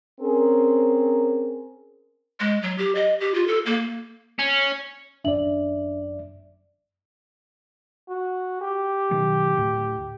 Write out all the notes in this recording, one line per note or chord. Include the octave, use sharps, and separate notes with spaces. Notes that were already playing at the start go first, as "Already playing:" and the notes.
C4 C#4 G#4 A#4
G#3
F#3
G4
D#5
G4
F4
A4
A#3
C#4
G#1 F#2 D4 D5 E5 F#7
F#4
G4
B2 D#3 F#3
D2 A2